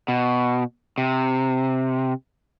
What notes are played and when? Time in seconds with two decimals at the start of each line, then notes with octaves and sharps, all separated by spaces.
0.08 B2
0.98 C3